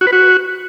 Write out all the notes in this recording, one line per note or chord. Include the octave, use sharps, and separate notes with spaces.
F#4
B4
F#4